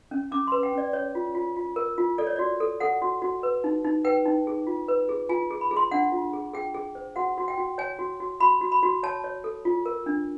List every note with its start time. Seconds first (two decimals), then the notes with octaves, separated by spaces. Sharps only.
0.11 C#4
0.31 C#4 D6
0.47 B4 C6
0.63 G5
0.73 C#4 D5
0.93 C#5
1.15 F4
1.35 F4
1.57 F4
1.76 A#4
1.98 F4
2.18 A4 D5
2.27 C#5
2.36 F#4 D5
2.60 A4
2.80 A4 F#5
3.02 F#4
3.22 F#4
3.43 B4
3.64 D#4
3.84 D#4
4.04 B4 G5
4.26 D#4
4.47 G#4
4.67 F4
4.88 B4
5.09 G#4
5.29 F4 G#5
5.51 G#4
5.61 B5
5.71 G#4
5.77 C6
5.91 D4 F#5
6.12 F4
6.33 G#4
6.54 G#4 G5
6.74 G#4
6.95 C5
7.16 F#4 F#5
7.38 F#4
7.48 G5
7.58 F#4
7.78 C#5 G#5
7.99 F#4
8.20 F#4
8.40 F#4 B5
8.61 F#4
8.72 B5
8.83 F#4
9.03 C#5 A5
9.24 C#5
9.44 A4
9.65 F4
9.86 A#4
10.06 D4